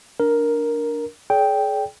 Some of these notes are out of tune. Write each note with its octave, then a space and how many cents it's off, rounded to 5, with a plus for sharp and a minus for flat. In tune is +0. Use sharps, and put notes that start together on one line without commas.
D4 -5 A#4 +5
G#4 +40 D5 -35 G5 +0